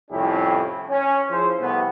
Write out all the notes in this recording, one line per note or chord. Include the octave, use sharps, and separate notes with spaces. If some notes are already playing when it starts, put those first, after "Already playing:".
C2 F2 A2 C#4 E4 G4
C#4
F3 E4 G#4 C5
C2 C3 A3 B3